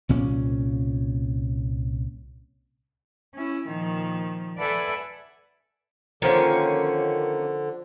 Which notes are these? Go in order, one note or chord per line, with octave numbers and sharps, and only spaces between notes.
C2 A#2 C#4
C#4 E4
A#2 D#3 F3
A4 B4 D5 E5 F#5 G#5
D3 D#3 F3 A#3 C#4 C5